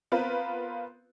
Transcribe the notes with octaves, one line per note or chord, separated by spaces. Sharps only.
B3 C4 F4 A#4 B4